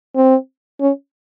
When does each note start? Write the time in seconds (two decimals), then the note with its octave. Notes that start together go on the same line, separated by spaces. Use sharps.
0.16 C4
0.81 C#4